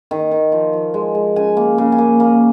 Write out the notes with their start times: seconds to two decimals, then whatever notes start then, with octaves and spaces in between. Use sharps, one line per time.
0.11 D#3
0.31 D#3
0.52 F3
0.73 F3
0.94 G#3
1.15 G#3
1.36 C#3 G#5
1.57 A#3
1.78 C#3
1.92 G#5
1.98 A#3
2.20 A#3